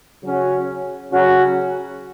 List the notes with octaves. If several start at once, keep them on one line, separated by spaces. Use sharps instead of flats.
C#3 F#3 C#4 F#4
C#3 F#3 C#4 F#4